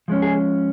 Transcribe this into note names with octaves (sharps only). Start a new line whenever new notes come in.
F3 G#3 C#4
G#4